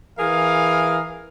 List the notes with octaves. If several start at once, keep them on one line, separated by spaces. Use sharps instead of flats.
E3 G#4 A#4 F5